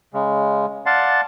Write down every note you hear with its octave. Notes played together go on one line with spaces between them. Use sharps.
C#3 G#3
D5 F5 F#5 A5 C6